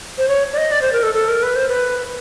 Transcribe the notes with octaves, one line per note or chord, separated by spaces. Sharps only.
C5
C#5
D5
D#5
D5
C5
A#4
A4
A4
A#4
B4
C5
B4